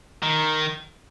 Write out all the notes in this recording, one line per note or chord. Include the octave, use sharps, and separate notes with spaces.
D#3